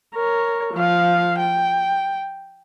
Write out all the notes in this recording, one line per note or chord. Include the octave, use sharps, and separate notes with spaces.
A#4 C#5
F3 F5
G5